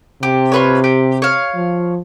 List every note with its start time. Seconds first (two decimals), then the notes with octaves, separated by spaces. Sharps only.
0.23 C3 G4
0.52 F4 B4 C#5
0.84 G4
1.22 C#5 F5
1.55 F3